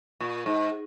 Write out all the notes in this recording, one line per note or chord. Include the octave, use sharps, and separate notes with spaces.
A#2
G#2